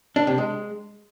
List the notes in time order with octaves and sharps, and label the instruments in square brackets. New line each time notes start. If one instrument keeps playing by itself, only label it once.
[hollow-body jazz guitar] D4
C3
G#3